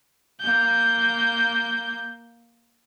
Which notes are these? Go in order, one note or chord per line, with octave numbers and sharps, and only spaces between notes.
A#3 G6